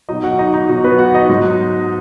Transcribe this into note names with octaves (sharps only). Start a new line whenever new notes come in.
B2 F#3 D#4 D#5
F#4 F#5
D#4 D#5
D#4
B2 F#3 F#4
B3 B4
F#4 F#5
D#4 D#5
G#2 F#3